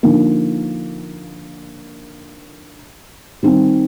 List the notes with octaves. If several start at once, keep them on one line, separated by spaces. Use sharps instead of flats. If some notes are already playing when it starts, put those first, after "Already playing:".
D3 F3 A#3 D#4
D#3 G3 C4 D#4